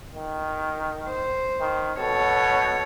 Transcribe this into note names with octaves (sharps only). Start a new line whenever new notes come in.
D#3
C5
D#3
B2 A4 C#5